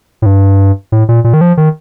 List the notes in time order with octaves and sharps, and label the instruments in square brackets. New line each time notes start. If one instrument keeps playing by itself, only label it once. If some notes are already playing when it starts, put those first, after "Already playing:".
[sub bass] A2
G2
A2
A#2
A#2
D#3
F3
D#3